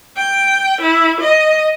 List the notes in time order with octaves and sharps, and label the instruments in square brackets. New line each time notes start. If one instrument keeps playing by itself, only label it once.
[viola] G5
E4
D#5